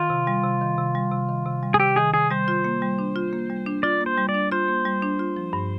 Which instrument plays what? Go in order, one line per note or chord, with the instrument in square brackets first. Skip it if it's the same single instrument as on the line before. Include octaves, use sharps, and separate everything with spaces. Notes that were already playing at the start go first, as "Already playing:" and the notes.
Already playing: [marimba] D#3 [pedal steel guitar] F4
[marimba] C3
G3
C3
D#3
C3
G3
C3
D#3
C3
G3
[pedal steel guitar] G#4
[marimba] C3 [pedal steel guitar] G4
[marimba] D#3 [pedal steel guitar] G#4
[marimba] C3 [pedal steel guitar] G#4
[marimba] G3 [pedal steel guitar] C5
[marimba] F4
A#3
G3
D4
F4
A#3
G3
D4
[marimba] F4 [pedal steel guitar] D5
[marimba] A#3
[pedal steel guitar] C5
[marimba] G3
[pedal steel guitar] D5
[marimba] D4
[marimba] F4 [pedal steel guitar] C5
[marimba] A#3
G3
D4
F4
F3
G2